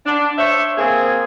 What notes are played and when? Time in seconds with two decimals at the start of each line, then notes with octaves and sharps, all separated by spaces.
0.06 D4
0.38 C5 C#5 E5
0.78 A#3 C4 G#4